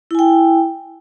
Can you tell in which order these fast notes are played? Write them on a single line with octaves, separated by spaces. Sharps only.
E4 G#5 G5